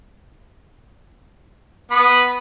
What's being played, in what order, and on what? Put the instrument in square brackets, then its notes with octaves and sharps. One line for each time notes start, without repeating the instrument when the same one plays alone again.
[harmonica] B3 [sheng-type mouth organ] B5